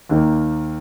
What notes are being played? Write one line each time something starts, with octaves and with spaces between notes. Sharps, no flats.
D#2 D#3 A#3